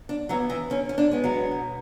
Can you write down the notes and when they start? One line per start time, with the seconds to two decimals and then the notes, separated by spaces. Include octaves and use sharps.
0.09 D4
0.29 E3 F#3 B3 F#4
0.50 E3 E4
0.70 D3 C#4
0.89 C#4
0.98 D4
1.11 G#3 B3
1.24 F#3 F#4
1.51 B2